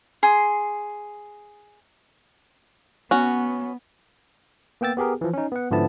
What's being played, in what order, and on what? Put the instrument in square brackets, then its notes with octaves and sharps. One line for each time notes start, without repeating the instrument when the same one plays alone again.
[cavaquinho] G#4 C6
[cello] B3 [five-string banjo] C#4 F#4
[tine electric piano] A#3 B3 G5 E6 A6
B3 G4 G#4 A#4
E3 F3
C#4 D#4
B3 F#5
G#2 D3 F3 B3 E4 A5